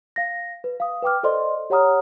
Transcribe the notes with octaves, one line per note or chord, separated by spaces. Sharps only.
F5 A#6
B4
F5 D#6
B4 G5 D6 F6
A4 C5 D5 D#5 C6
G4 C#5 F#5 A#5 D#6 F6